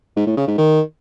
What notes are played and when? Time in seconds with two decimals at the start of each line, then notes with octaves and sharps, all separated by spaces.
0.16 G#2
0.27 A2
0.37 C#3
0.47 G#2
0.58 D#3